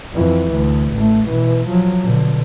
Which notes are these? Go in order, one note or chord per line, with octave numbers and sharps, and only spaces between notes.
F2 E3
D2
A1 A3
B2 E3
F3 F#3
B2 D3